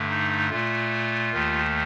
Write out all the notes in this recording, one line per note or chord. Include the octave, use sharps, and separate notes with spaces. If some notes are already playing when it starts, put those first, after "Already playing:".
Already playing: G2 D3 A3
D#4
A#2 A3 F4
D#2 D#3 A3